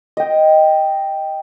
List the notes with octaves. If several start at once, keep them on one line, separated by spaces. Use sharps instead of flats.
D#5 G5